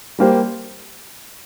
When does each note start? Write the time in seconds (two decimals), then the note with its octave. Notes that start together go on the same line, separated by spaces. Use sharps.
0.19 G3 A#3 G4 C5